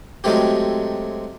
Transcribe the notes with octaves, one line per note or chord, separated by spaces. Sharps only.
F#3 G#3 A3 C4 G4